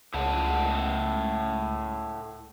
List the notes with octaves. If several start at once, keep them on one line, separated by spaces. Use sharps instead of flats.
C#2 A2 F#5 A5